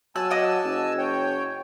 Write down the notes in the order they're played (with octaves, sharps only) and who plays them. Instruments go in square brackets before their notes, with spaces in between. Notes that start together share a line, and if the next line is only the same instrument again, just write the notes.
[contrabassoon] F#3 [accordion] G#5 A5 E6 [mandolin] F#6
[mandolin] D#5 F#5 D6
[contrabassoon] F#1
[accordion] C#5 G5